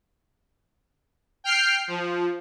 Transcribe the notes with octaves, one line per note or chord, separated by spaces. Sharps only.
G5 F6 C7
F3